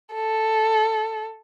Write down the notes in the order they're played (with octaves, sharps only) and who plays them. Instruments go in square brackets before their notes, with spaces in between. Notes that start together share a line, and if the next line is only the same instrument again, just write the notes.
[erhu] A4